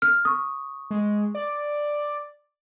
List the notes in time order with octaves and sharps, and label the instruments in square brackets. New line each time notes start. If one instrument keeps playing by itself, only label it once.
[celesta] F6
C#6 D#6
[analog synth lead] G#3
D5